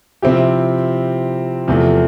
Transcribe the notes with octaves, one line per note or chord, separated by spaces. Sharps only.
C3 F3 C4 E4 G4
E2 C3 F3 A3